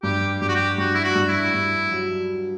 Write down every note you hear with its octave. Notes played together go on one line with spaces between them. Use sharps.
G2 G4
G2 G4
F#4
G4
G2 F#4
E4
F#4
G2
E4
G2
F#3